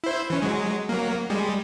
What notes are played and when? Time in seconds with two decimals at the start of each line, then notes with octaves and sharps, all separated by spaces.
0.04 E4 C5
0.30 E3 C#4
0.42 F#3 G#3
0.89 F#3 A#3
1.30 G3 G#3